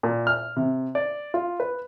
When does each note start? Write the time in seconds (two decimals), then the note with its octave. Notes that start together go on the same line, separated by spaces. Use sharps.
0.03 A#2
0.27 F6
0.56 C3
0.95 D5
1.34 F4
1.60 B4